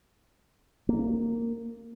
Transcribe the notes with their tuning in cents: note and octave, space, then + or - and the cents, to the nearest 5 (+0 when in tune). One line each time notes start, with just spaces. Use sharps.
A#3 -10